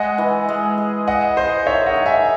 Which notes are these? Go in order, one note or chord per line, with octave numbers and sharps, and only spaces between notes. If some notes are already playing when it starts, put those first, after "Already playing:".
Already playing: G#3 D#5 F#5
E3
G#3
G#4
G#3 D#5 F#5
G#4 C5 D#5
D#3 C#5 E5
D#5 F#5
D#3
E5 G#5